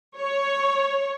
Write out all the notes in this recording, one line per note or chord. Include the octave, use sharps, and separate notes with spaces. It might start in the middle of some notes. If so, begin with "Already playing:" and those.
C#5